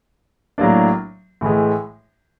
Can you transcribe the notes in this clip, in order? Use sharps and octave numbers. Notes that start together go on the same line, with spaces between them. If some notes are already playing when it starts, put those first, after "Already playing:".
A2 F#3 A#3 D4
A2 E3 G#3